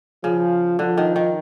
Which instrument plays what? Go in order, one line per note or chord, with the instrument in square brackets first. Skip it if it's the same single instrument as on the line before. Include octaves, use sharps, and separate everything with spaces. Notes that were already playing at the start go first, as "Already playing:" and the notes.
[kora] C#3 [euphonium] F3
[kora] D3 [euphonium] F3
[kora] D#3
D#3